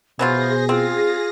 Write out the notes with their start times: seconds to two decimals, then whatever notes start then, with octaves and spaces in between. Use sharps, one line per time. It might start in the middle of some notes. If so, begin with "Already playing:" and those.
0.19 B2 E3 F#3 F4 G#4 C5 A#6
0.69 C4 F4